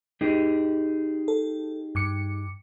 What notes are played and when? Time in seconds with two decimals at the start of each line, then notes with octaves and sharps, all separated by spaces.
0.21 D#4 G4 G#4
1.28 A4
1.95 G2 D6 C#7